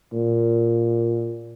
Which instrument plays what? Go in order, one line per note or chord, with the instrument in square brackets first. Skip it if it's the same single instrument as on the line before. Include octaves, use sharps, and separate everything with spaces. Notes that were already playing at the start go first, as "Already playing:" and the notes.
[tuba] A#2